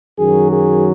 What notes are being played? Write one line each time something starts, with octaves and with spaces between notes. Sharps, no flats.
F#2 D#3 F#3 G#4
G#4